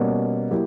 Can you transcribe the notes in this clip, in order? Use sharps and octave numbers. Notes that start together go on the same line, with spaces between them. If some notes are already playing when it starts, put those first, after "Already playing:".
Already playing: B2 G3 A#3 C#4
F#3 A#3 E4 G4